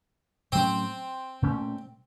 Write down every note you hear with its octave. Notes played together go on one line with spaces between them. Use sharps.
A2 F#3 A3 C4 C#4
A#2 A3 C#4